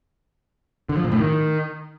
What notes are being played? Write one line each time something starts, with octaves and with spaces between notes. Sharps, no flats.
D3
F3
A#2
A2
D#3